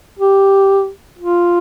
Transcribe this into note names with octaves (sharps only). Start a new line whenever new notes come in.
G4
F4